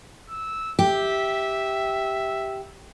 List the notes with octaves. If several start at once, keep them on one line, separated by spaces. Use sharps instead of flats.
E6
G4 E5